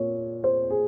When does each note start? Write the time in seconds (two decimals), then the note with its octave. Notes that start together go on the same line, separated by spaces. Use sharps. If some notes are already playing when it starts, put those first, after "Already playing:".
Already playing: A#2 C#5
0.44 C5
0.70 G#4